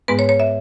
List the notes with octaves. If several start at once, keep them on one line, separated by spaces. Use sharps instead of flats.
G#2 G#3 B3 B4
C#5
C#5
E5